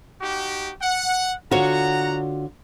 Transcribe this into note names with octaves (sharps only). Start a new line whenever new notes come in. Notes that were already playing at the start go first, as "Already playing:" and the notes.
D#4 F#4 G4
F#5
D3 F4 F#4 C#5 F#5 A#5